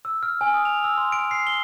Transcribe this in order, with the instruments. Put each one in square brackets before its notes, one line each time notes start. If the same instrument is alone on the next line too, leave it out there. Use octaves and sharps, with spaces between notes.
[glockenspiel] E6
F6
G#5
D#6
F7
E6
C6
D7
C7
G7